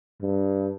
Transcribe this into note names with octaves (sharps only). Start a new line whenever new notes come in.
G2